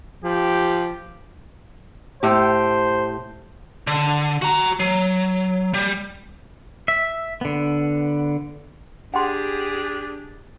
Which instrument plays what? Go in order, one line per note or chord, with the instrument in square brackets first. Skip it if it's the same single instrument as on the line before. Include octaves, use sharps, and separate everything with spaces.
[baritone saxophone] F3 [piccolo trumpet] G4
[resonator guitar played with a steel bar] A2 G4 [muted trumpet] C5
[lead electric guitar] D3
F#4 A#5
F#3
G3
[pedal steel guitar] E5
D3 B3
[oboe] D4 [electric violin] G4 G#4 [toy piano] F#5 G5 C6